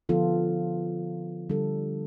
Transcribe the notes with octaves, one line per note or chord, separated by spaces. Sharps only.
D3 F3 B3 F4 A4
D3 G3 D4 A4